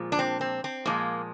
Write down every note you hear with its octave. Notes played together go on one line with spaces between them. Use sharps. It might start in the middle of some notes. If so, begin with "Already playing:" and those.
Already playing: A#2 F3 G#3
D4
C4
C4
C4
A#2 F3 G#3 A#3